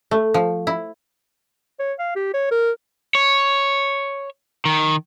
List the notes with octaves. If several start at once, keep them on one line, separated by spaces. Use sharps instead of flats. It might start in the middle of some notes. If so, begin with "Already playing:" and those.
A3
F3
E4
C#5
F5
G4
C#5
A#4
C#5
D#3